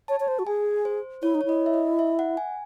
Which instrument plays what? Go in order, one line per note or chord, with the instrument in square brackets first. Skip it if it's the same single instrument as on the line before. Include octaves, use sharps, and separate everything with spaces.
[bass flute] C#5 [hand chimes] A5
[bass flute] C#5
C5
F#4
[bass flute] G#4 [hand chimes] G#5
[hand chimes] C5
[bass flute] E4 [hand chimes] C#5
[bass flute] D#4
[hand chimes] C#5
[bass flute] E4 [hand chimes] D#5
[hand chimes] E5
D#5
E5
F#5
G#5